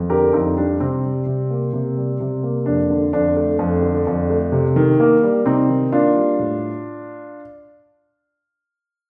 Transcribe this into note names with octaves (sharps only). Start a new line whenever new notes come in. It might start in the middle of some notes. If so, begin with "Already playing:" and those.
Already playing: F2
D3 G4 A#4
F2 C4 D#4
G3 D4
C3 C4
G3
C3
A#3
C3
G3
C3
A#3
F2 D4
D3
F2 D4
A3
F2
D3
F2
A3
C3
D#3
A#3
G3
C3 C4 D#4
D#3
A#3 D4 F4
G3
A2